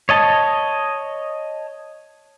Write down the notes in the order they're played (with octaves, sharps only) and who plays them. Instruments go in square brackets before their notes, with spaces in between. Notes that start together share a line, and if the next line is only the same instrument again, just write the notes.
[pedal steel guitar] C#5 D#5 A5